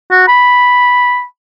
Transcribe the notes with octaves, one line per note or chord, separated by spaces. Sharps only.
F#4
B5